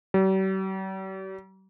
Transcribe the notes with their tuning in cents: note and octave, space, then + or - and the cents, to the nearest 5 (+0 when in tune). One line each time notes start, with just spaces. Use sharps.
G3 -45